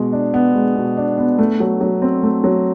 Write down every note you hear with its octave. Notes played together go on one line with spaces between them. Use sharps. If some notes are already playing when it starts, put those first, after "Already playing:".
Already playing: B2 G#3
D4
B3
G#3
B2
D4
B3
A3
F#3
F#3
C4
A3
F#3